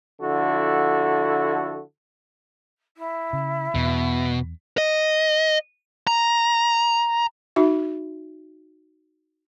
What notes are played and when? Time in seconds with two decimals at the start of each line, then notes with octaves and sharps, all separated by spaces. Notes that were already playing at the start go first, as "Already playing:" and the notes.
0.21 D3 F3 E4 F#4 A4
2.97 E4
3.33 C#3
3.75 E2 B2
4.78 D#5
6.07 A#5
7.56 D#4 F#4 E5